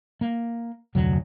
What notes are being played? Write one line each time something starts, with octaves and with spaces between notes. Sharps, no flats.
A#3
F1 D2 F#3